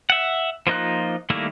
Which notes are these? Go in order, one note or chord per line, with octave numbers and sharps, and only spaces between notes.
E5 F#5
F3 A#3 D#4 F4 F#6
D#3 G3 A3 A#3 E4